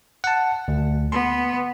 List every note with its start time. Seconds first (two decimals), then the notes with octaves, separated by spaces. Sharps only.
0.24 F#5 A5
0.68 D2
1.12 B3 C6